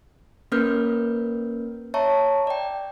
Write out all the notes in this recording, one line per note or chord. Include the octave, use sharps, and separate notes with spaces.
A#3 C#4 A#4 B4 F6 G6
C#5 E5 A5 A#5 C#6
D5 G5